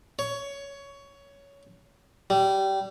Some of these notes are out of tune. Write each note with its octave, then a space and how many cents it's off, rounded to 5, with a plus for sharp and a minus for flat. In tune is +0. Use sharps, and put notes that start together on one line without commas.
C#5 +15
G3 -20